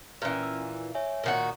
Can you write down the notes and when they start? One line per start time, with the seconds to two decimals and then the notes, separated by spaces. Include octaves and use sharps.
0.22 A#2 E3 C#4 F6
0.43 E6
0.95 C#5 E5 G#5
1.24 A#2 D#3 F#4